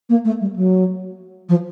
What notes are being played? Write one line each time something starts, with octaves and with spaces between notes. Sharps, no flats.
A#3
A3
G3
F#3
F3